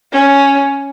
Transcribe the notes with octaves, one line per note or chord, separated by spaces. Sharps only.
C#4